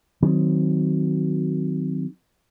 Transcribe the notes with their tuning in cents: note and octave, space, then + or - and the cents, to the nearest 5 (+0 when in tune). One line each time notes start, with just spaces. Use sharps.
D#3 +0 F#3 +0 C4 -20